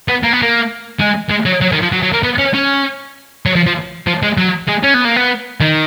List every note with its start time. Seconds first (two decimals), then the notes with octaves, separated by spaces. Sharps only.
0.08 B3
0.23 A#3
0.33 B3
0.42 A#3
1.00 G#3
1.31 G#3
1.46 F#3
1.61 F#3
1.72 D#3
1.82 F3
1.92 F#3
2.02 F#3
2.13 A#3
2.23 B3
2.38 C#4
2.54 C#4
3.46 F#3
3.56 F3
3.66 F3
4.07 F3
4.23 G#3
4.38 F#3
4.68 G#3
4.84 C#4
4.94 B3
5.05 A#3
5.16 B3
5.61 D#3